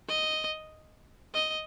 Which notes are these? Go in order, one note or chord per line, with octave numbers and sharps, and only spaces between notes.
D#5
D#5